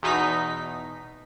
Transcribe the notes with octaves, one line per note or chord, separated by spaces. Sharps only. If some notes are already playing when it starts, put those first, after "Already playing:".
E2 B2 D#4 B6